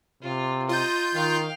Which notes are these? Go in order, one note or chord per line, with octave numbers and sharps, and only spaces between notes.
C3 F4
F4 D#5 A#5 G6
D#3 F5 G5